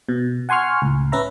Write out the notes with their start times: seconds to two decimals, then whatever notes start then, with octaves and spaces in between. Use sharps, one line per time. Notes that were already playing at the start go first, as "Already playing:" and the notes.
0.09 B2
0.49 F#5 G#5 C6 C#6 F6
0.82 C#2 A2
1.12 C#4 B4 E5 A#5